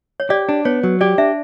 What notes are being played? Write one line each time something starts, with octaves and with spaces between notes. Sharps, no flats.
C#5
G4 D5
D4
B3 C#5
F#3
G4 D5
D4 E5